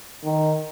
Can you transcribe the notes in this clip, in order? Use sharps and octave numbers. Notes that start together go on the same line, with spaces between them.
D#3